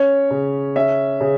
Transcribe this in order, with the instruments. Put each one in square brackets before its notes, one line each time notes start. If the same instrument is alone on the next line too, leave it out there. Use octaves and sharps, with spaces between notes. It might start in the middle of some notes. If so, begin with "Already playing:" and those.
Already playing: [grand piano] C#4 C#5
C#3
C#4 E5
C#3